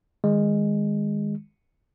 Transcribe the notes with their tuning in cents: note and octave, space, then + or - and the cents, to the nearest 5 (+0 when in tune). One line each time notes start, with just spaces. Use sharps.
D#3 +0 G#3 -15